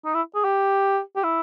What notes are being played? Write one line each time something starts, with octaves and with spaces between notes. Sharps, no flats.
D#4
E4
G#4
G4
G4
E4